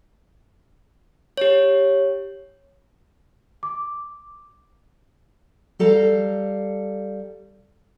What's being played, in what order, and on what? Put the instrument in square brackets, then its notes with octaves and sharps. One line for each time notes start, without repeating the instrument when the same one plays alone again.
[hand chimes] G4 C#5
[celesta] D6
[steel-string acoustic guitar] G3 A4 F5 A#5